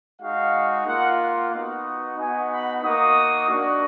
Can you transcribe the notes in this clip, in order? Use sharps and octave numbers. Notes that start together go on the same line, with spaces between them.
G#3 D#4 F#4 F5
A#3 F4 F#5
F#5
B3 D#4 F#4
B3 D#4 F#4 G#5
B5
A#3 D#4 F#4 D#6
A#3 D4 F#4